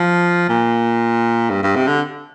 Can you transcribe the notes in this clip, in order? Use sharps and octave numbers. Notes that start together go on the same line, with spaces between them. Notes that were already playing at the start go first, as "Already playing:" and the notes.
Already playing: F3
A#2
G2
G2
C3
D3